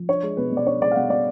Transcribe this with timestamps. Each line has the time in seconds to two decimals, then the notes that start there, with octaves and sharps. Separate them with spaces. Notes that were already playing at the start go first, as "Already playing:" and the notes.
Already playing: F3
0.09 D4 C#5
0.23 G#3
0.37 B2 B4
0.52 B2 D5
0.66 D4 C#5
0.82 G#3 D5
0.91 F5
0.95 B2 F#5
1.10 B2 D5